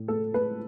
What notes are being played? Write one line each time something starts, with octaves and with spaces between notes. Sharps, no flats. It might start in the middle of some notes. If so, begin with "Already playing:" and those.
Already playing: A2
A3 A4
A3 B4